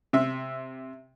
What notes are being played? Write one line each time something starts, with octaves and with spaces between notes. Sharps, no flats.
C3 E5